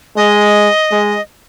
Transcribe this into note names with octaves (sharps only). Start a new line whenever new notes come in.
G#3 D#5
G#3